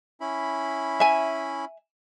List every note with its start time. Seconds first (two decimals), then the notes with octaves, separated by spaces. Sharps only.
0.21 C#4 E4 B5
1.00 E5 G#5